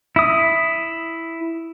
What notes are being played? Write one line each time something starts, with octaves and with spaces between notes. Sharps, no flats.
E4 D#6